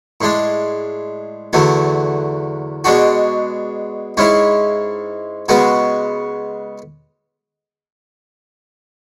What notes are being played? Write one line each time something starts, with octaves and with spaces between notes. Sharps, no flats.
A2 G#3 D4
E2 D3 F#3 A3
B2 G#3 D4 F#4
G#2 G#3 C#4 E4
C#3 G#3 B3 F#4